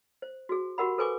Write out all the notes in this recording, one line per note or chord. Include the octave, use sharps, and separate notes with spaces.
C5
F#4 G#4
F#4 G4 A#4 F#5 B5
A4 B4 C5 G#5 C#6 D6